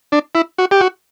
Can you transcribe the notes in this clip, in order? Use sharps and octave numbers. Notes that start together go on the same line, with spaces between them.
D4
E4
F#4
G4
F#4